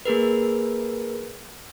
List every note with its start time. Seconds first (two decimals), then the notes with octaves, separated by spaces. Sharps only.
0.05 A#3 G#4 A#4 B4